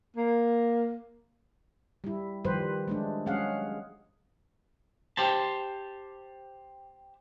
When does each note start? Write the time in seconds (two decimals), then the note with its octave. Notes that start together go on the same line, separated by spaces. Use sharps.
0.16 A#3
2.04 G3 E4
2.45 D#3 F3 G3 G4 B4 C5
2.88 G#3 A3 D4
3.26 F#3 G#3 C#4 G#4 F5 F#5
5.17 G4 C5 A5